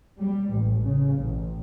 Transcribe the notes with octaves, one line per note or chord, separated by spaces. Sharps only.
G3
A1
C#3
A1